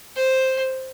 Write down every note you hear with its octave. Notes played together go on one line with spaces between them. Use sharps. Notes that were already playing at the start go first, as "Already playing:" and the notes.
C5